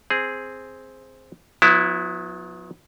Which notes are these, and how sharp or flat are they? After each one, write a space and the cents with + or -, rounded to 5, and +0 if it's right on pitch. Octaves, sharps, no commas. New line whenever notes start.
C4 +0 G#4 +0
F#3 -45 B3 +0 E4 +0